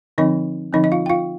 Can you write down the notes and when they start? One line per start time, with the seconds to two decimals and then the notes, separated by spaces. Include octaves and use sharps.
0.18 D3 F3 C4 D#4 D#5
0.73 D3 F3 C4 D#4 D#5
0.84 D#5
0.92 F4 F5
1.06 G5
1.09 F4 F5